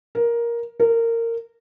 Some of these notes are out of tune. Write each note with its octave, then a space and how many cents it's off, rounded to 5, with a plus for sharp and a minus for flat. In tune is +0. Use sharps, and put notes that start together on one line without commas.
A#4 +10
A#4 -20